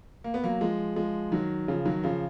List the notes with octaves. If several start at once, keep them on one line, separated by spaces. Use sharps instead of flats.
A#3
B3
F#3 A#3
F3 G#3
F3 G#3
D#3 F#3
C#3 F3
D#3 F#3
C#3 F3